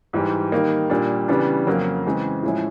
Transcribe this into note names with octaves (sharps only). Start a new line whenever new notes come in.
G#2 E3 G3
D#3 G3 A#3 D#4
A#2 G3 A#3 D4
C#3 E3 G3 B3 D4
F2 C#3 F#3 A#3
C#3 E3 G#3 C4
A2 F3 G#3 C#4 E4